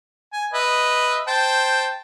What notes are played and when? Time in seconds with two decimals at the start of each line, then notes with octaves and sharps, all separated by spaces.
0.33 G#5
0.54 B4 D#5 E5
1.27 C5 G5 A5